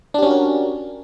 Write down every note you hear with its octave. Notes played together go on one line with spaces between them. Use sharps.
C#4 D4 F#4 G4 A#4